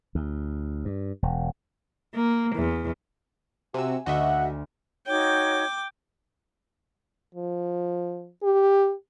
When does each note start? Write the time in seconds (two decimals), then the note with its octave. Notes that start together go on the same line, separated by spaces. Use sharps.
0.15 D2
0.85 G2
1.23 E1
2.15 A#3
2.55 E2
3.74 C3 F#4 G#5 E6
4.06 D2 F#4 D#5 E5 F#5
5.06 D#4 F#4 C#5 G5 D6
7.35 F3
8.43 G4